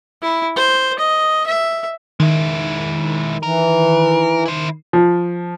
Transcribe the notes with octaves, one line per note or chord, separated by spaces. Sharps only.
E4
C5
D#5
E5
D#3 G#3 E4
E3 A#4
E4 C5
F3